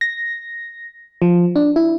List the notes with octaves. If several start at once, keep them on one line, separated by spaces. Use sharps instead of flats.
A#6
F3
D4
E4